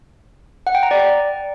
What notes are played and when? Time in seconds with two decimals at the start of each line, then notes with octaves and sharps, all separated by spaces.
0.67 F#5
0.75 G5
0.83 A#5
0.91 D5